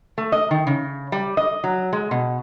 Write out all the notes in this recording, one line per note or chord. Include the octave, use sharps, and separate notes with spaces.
A3
D#5
D#3
C#3
G3
D#5
F#3
G#3
B2